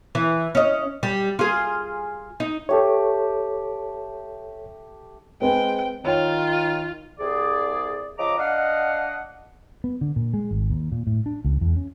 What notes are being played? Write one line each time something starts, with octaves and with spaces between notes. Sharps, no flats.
E3
C#4 D#5
G3
F4 G#4
D#4
A3 G4 A4 C#5
G#3 C4 B4 G5
D#3 F4 C#5 G5
C2 G#4 D5
C#3 F3 D#5 A#5 D6
D4 D#5 F5 F#5
B3
D3
A#2
G#3
G#1
D#2
A#2
A2
D4
C#2
E2
C#4